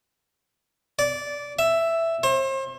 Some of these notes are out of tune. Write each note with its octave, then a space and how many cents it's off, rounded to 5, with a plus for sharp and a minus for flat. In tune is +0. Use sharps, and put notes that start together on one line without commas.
D5 -15
E5 +5
C5 +40